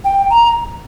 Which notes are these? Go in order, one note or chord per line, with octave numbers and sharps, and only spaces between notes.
G5
A#5